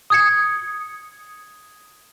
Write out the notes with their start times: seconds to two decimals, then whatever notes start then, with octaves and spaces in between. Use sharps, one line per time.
0.10 D#6 G#6 C#7